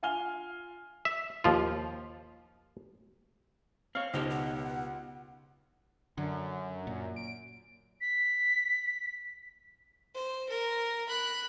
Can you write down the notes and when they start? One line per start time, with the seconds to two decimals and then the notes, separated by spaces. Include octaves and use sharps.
0.03 F4 F5 G#5 F6 G7
1.05 E5
1.44 D#2 F3 F4
3.95 C4 C#5 F5
4.14 C#2 B2 D#4 G4 C5
4.30 F#5
6.17 F#2 D3
6.87 A#2
7.16 D7
8.01 B6
10.14 C5
10.49 A#4
11.09 B5 F#6